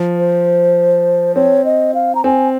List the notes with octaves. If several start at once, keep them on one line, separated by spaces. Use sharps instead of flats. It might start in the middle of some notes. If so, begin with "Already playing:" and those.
Already playing: F3
C5
C4 C#5
D#5
F5
A#5
C4 G#5